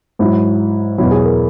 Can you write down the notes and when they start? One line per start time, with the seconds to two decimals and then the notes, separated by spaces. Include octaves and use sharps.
0.19 G#2 F#3 E4
0.98 E2 B2 F#3 E4
1.11 G#4
1.24 A#4